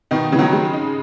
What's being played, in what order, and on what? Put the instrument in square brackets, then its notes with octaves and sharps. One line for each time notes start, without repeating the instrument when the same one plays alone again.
[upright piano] B2 D#3 [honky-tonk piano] D#4
[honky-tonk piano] C#3 [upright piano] E3
[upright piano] D#3 F#3
[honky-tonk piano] G#3
D#4